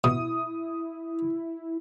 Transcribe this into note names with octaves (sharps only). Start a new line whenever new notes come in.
B2 E4 D#6